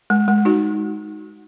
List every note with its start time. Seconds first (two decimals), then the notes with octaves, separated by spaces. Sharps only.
0.10 G#3
0.28 G#3
0.45 D#4 F#4